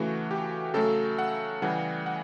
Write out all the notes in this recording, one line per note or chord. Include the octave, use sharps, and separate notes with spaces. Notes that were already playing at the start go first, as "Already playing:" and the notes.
Already playing: C#3 E3 A3 F#4
G4
C#3 F#3 A3 A4
F#5
C#3 E3 G3 F#5
F#5